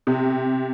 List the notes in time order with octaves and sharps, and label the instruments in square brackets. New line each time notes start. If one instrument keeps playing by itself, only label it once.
[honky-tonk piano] C3